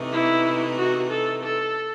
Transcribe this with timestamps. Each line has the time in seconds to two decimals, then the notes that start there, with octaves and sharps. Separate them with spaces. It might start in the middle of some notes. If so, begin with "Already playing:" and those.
Already playing: C3 E3 A3 D#4
0.13 E4
0.78 F#4
1.11 A4
1.43 A4